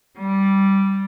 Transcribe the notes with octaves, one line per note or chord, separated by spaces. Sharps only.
G3